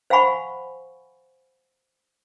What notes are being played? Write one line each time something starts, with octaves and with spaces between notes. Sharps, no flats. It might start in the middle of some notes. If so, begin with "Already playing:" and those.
C5 F5 F#5 G#5 B5 C#6